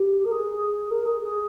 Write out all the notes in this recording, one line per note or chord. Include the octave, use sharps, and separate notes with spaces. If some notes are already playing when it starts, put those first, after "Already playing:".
Already playing: G4
A#4
G#4
A#4
G#4
G#4